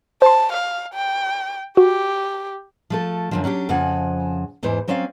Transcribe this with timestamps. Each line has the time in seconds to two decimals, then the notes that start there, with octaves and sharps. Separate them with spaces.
0.22 C5 A5 C6
0.53 F5
0.94 G5
1.77 F#4 G4
2.90 F3 A3 A4
3.31 F#2 D3 F3
3.44 F#3 C#4 D4 G4
3.69 F2 C#3 F3 F#5 G#5
4.63 E2 G#2 E3 C5
4.88 F#3 C4 C#4 D5 E5 F5